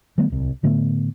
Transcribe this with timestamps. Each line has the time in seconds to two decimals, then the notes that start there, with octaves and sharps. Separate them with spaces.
0.18 D#3 G3 A3 B3
0.30 D1 C2
0.63 A2 D3 A3 B3